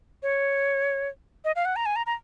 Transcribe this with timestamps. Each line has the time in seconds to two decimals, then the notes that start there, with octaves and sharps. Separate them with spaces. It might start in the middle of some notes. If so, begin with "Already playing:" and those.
0.23 C#5
1.45 D#5
1.56 F5
1.65 F#5
1.76 A#5
1.86 G#5
1.96 A#5
2.06 A#5